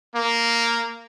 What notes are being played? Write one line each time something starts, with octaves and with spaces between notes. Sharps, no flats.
A#3